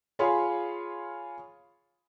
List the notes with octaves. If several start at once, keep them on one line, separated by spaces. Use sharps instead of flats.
F4 G#4 C#5 F5 B5 C6